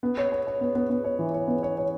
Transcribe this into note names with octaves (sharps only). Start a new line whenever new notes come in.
B3
C#5
C#5
C#5
B3
B3
B3
C#5
E3
C#5
B3
C#5
C#5